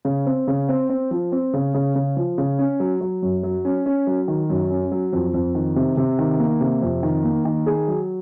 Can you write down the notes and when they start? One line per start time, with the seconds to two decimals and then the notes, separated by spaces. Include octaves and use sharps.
0.05 C#3
0.26 C4
0.47 C#3
0.69 C4
0.89 C4
1.11 F3
1.32 C4
1.54 C#3
1.74 C#3
1.95 C#3
2.17 F3
2.38 C#3
2.59 C#4
2.80 F#3
3.01 F#3
3.22 F#2
3.43 F#3
3.65 C#4
3.86 C#4
4.07 F#3
4.28 D#3
4.50 F#2
4.70 C#4
4.92 F#3
5.13 F2
5.34 F2
5.55 D#3
5.76 C3
5.97 C3
6.19 D#3
6.39 A#3
6.60 C3
6.82 F2
7.03 D#3
7.24 A#3
7.45 D#3
7.66 G#4
7.88 F#3